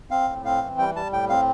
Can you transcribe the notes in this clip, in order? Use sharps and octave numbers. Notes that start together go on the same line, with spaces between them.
C4 F5
A2
C4 F5
E3
G3 G5
G3 A5
A2 G5
C4 F5